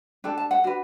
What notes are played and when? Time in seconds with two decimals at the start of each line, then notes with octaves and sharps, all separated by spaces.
0.24 D4 A4 G5
0.38 A5
0.51 F#5
0.64 D4 F#4 B4